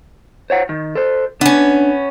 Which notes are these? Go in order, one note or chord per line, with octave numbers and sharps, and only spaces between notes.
C5 C#5 F#5
D#3
A4 C5
B3 C#4 D4